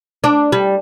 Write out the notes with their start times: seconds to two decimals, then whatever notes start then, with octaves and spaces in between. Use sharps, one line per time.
0.24 D4
0.52 G3